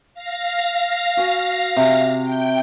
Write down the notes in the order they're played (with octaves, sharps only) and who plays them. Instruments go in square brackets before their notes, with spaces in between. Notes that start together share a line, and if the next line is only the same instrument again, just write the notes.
[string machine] F5 A#6
[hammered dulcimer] F#4 G#5
C3
[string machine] G5